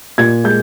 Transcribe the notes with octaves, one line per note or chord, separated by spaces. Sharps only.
A#2 G#6
G#3 G6